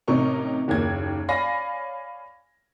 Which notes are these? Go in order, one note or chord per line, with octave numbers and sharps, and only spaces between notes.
A1 C3 D#4 A#4 C#6
F#1 D#2 A#3 G#6
C#5 D5 F5 G#5 B5 A#6